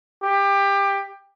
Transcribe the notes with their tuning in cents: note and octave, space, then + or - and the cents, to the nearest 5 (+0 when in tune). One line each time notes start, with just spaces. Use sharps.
G4 +20